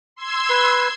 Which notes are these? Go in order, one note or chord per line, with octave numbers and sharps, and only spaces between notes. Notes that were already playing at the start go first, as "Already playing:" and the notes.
C6 E6 G#6
B4